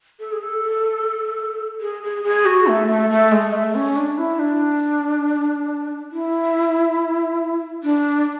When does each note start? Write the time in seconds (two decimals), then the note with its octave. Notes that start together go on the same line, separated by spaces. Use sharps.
0.20 A4
0.32 G#4
0.43 A4
1.81 G#4
2.03 G#4
2.23 G#4
2.46 F#4
2.67 A3
2.88 A3
3.10 A3
3.32 G#3
3.53 A3
3.75 C#4
3.96 D4
4.18 E4
4.39 D4
6.12 E4
7.83 D4